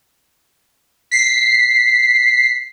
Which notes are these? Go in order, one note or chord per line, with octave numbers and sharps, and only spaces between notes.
B6 C7